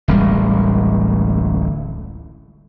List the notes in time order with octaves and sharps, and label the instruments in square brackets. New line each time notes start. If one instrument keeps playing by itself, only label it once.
[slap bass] D1 A1 G3 G#3